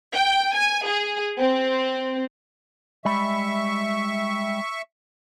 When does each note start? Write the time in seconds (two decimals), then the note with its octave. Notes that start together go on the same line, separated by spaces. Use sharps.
0.14 G5
0.54 G#5
0.86 G#4
1.39 C4
3.05 G3 G#3 E5 B5 C#6